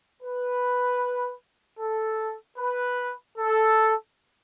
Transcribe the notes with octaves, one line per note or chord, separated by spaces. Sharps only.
B4
A4
B4
A4